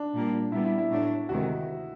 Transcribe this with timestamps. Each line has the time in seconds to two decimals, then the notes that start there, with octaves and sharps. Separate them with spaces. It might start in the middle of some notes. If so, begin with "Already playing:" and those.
Already playing: D4
0.14 A#2 G3 A#3
0.52 A#2 G3 B3 E4
0.65 E4
0.78 E4
0.91 A2 F#3 A3 D4
1.29 D2 C3 D#3 G#3 F#4